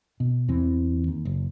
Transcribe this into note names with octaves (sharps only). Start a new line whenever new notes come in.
B2
E2 E3 C4
D#2
F#1